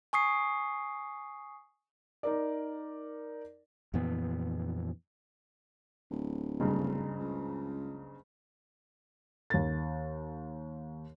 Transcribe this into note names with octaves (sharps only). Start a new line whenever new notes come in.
G#5 C#6 D#6 C7
D#4 A#4 D5
F2 A#2 E3 B3
D1
F#1 G2 C#3
C#2
D#2 A6